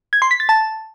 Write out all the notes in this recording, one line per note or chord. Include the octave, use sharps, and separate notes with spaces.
G#6
C6
B6
A6
A5